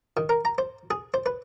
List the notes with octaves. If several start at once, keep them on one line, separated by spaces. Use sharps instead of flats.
D#3
A#4
A#5
C5
G#4
C5
B4